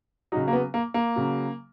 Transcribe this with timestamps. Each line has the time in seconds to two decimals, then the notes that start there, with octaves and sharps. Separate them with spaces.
0.32 C#3 F#3 D#4
0.48 A#3
0.53 B3
0.74 A#3
0.94 A#3
1.16 C#3 F#3